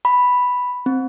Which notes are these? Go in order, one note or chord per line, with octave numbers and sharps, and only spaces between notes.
B5
C4